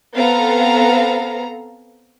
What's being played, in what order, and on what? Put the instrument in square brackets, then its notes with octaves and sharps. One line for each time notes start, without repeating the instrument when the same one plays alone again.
[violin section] B3 C4 A4 F5 A#5